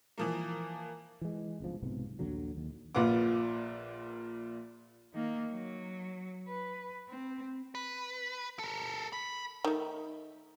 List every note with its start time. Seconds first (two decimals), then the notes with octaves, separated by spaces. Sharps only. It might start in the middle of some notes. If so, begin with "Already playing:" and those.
0.18 E3 F3 A#3
1.21 E3 G#3
1.60 G1 C#2 F3
1.82 B1 G#2 C3 B3
2.19 A#1 D#2 D3 F#3
2.57 D#2
2.95 A#1 A#2 F4 B4 F#5 D6
5.14 D#3 A#3
5.51 F#3
6.48 B4
7.09 C4
7.75 B4
8.59 A4 A#4
9.13 B5
9.65 D#3 A3